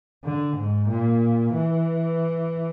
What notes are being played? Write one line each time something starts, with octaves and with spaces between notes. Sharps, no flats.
D3
G#2
A#2
E3